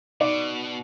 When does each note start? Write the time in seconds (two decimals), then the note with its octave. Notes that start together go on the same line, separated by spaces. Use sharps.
0.21 B2 D#4 D5 D6